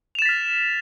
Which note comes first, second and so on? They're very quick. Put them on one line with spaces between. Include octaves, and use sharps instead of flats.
F7 E7 A6 B6 F6